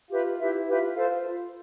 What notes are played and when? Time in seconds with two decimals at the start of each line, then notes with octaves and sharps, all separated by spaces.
0.10 F4 G4 B4 E5
0.39 E4 G4 B4 E5
0.67 F4 G4 B4 E5
0.95 A4 C5 F5